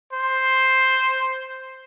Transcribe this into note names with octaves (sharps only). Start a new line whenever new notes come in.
C5